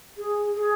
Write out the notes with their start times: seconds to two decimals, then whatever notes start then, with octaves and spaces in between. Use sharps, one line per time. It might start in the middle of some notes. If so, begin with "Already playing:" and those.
0.18 G#4
0.55 G#4